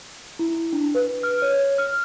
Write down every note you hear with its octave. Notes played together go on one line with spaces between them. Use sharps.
E4
D4
B4
F6
C#5
F6